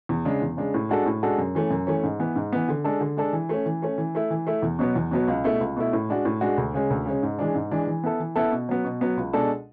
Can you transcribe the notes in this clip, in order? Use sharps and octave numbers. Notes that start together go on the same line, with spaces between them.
E2
C#3 G#3 D4
E2
C#3 G#3 D4
A2
G#3 D4 F#4 A4
A2
G#3 D4 F#4 A4
F#2
E3 A3 C#4
F#2
E3 A3 C#4
G#2
E3 B3
G#2
E3 B3
D3
G#3 D4 A4
D3
G#3 D4 A4
E3
A3 C#4
E3
A3 C#4
E3
A3 E4
E3
A3 E4
E2
B2 F#3 B3
E2
B2 F#3 B3
C#2
B2 A3 E4
C#2
B2 A3 E4
A2
G#3 D4 F#4
A2
G#3 D4 F#4
D2
C#3 G#3 C#4
D2
C#3 G#3 C#4
G#2
E3 G#3 D4
G#2
E3 G#3 D4
E3
B3 E4 A4
E3
B3 E4 A4
B2
F#3 B3
B2
F#3 B3
C#2
B2 G#3 D4 A4